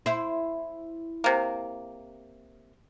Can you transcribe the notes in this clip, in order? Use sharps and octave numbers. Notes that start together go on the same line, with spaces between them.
E4 C5
C3 A#3